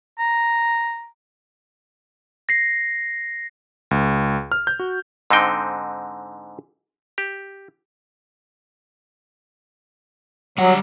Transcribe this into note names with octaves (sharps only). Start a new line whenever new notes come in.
A#5
A#6 C7
C#2
F6
G6
F#4
G#2 D3 C4 D#4 G5
G4
F#3 G3 F#5